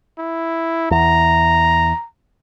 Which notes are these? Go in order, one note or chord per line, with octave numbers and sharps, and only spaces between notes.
E4
E2 A#5